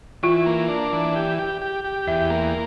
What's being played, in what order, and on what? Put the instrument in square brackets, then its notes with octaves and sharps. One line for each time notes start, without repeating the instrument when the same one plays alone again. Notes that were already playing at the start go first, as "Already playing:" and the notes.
[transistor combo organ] E3 [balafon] F4
[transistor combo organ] A#3
D4
E3
G4
G4
G4
G4
[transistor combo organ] E2 [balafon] E5
[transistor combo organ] A#3